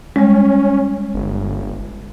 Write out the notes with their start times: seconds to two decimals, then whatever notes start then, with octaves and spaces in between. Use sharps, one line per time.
0.16 G3 G#3 C#4
1.14 G1